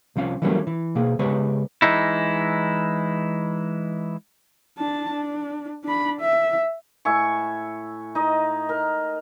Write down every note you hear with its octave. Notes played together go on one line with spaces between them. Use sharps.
C2 F3 C#4 F5
E3 F#3 G3 A3 A#3 C#4
E3
B2 A#3 G#4
C#3 G#3 B3 G4 B4 C#5
E3 G#3 D#4 E4
D4 A5
D4
D4 B5
E5
A2 E5 G#5 C#6
D#4 D#5
A#4